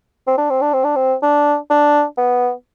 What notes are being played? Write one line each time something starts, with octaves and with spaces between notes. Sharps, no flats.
C4
D4
C4
D4
C4
D4
C4
D4
D4
B3